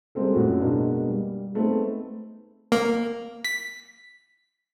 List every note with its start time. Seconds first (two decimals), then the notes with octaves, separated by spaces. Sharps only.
0.15 G3 G#3 A#3 C4 A4
0.34 F#2 A2 F#4
0.61 B2 G#3 A#3 D4
1.08 G3
1.54 G#3 A3 B3 C4 D#4
2.72 A#3
3.45 B6